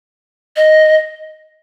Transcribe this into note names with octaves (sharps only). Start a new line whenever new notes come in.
D#5